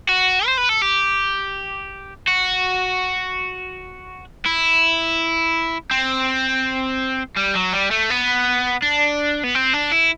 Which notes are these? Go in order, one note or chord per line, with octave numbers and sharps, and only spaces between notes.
F#4
C5
B4
A4
G4
F#4
E4
C4
G3
F#3
G3
A3
B3
D4
B3
C4
D4
E4